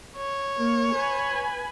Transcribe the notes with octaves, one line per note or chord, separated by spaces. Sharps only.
C#5
A#3
B4 G#5 B5